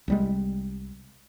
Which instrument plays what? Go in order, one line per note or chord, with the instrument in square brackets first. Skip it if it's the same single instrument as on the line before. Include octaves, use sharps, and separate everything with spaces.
[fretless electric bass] C2 G3 G#3